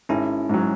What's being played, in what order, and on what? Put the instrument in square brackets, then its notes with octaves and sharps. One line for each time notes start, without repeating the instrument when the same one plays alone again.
[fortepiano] G#1 [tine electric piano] C#4 E4
[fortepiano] G#2 F#3